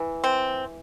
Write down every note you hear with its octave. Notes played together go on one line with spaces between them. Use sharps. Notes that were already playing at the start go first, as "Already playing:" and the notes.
Already playing: E3
C4